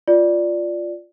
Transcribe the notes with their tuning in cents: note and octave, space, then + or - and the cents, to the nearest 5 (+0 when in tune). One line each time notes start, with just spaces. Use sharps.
F4 +0 D5 +0